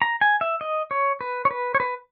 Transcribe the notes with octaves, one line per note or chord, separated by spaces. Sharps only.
A#5
G#5
E5
D#5
C#5
B4
C#5
B4
C#5
B4